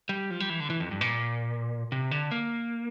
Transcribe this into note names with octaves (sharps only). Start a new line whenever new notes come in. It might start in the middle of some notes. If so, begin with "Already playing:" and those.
G3
F3
G3
E3
D3
E3
F2
G2
A#2
C3
D3
A#3